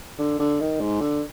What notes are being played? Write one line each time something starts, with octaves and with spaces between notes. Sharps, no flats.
D3
D3
D#3
G#2
D3